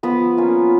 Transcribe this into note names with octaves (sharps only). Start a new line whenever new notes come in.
F3 B3 B4
A#3 C#4 F4